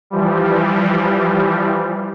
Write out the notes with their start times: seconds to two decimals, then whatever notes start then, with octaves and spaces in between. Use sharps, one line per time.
0.10 E3 F3 G3